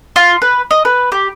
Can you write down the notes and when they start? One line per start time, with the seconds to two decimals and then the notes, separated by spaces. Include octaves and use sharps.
0.16 F4
0.42 B4
0.71 D#5
0.85 B4
1.12 G4